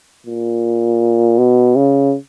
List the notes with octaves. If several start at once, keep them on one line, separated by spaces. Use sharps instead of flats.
A#2
B2
C#3